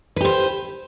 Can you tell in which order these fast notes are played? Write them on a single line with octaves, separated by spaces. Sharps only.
B4 G4 C5